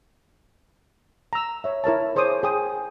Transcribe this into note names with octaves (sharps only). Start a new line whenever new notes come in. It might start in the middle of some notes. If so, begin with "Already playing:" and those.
A#5 E6
C#5 E5
E4 A#4 C#5 A5
G#4 C5 C#5 D6 D#6
G#4 G5 D#6